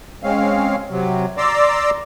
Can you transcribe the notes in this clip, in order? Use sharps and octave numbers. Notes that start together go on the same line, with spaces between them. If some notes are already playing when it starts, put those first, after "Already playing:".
G#3 C4 C#4 F5
C3 F#3
D5 A#5 C6 D6 E6